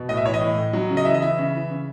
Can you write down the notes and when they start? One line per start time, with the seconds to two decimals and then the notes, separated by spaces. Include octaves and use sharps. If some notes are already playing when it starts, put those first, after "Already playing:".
Already playing: B2
0.09 A2 D#5
0.17 E5
0.25 E3 C#5
0.34 D#5
0.41 A2
0.58 A2
0.73 F#3
0.89 C#3
0.97 D#5
1.05 E3 E5
1.14 D#5
1.22 E3 E5
1.38 C#3
1.54 E3
1.70 C#3